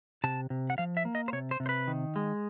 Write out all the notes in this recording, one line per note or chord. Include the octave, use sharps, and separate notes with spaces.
C3 A5
C3
F#5
F3 F5
E5
A#3
D#5
C5
C3 C#5
C5
C3
C5
B4
D#3
G#3